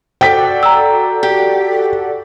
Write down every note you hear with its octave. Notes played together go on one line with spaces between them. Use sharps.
F#4 A4 D5 G5 B6
A#5 E6
G4